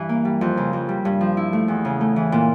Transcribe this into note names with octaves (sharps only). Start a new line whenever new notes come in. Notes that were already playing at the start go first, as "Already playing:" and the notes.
Already playing: G2 E3
A#3
G3
F2
C#3
F2
G3
G2
F3
E4
A3
E2
C#3
A3
E3
A#2